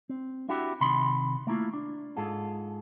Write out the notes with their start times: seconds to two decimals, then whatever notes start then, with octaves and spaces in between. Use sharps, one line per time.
0.09 C4
0.49 D4 E4 F#4 G4
0.81 C3 D#3 B5 C6
1.47 A3 A#3 E4 F4
1.74 D4
2.17 G#2 F4 G#4 A4